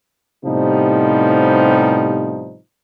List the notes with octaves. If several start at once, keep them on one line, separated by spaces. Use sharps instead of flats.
A2 C3 F3 G3 B3 D#4